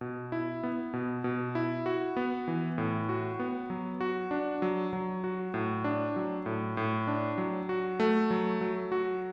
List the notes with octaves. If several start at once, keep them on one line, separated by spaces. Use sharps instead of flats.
B2
E4
B3
B2
B2
E4
F#4
B3
E3
A2
F#4
B3
F#3
F#4
D4
F#3
F#3
F#4
A2
D4
F#3
A2
A2
D4
F#3
F#4
A3
F#3
F#3
F#4